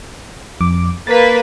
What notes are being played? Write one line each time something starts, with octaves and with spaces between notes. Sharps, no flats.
F2 D6
A#3 B4 A6 B6